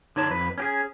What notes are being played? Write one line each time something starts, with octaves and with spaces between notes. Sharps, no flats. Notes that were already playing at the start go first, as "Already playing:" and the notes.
D3 D#4 C#5 A5
F2 B4
C#4 G4 G#4